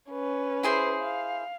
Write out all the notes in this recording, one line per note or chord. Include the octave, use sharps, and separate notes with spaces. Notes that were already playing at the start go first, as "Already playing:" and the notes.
C#4 B4
E4 G#4 C5
F5